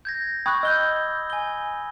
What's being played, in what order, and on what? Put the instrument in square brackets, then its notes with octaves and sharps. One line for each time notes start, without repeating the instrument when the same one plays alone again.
[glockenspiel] G6 G#6 A#6
[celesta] G5 C#6 F#6 [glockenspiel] B5 D#6 G#6
[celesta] D#5 G6 [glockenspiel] E6 G7
[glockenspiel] G#5 G7